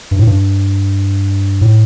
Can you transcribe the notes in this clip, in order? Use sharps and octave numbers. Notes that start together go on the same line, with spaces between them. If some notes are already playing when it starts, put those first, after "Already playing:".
G2
A2
G2
A2